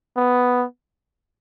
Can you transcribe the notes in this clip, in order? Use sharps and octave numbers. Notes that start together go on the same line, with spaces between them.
B3